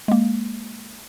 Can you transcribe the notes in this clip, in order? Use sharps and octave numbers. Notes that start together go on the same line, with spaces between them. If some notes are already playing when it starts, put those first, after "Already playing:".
G#3 A#3